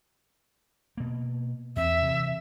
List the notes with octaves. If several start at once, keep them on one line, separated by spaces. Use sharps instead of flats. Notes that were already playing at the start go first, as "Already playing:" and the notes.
B2 A#3
E2 C4 E5
C3 E3